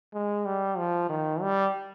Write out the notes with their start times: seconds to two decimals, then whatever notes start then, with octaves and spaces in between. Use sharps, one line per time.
0.14 G#3
0.46 G3
0.77 F3
1.09 D#3
1.42 G3